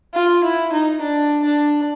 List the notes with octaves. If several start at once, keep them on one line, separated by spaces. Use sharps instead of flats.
F4
E4
D#4
D4
D4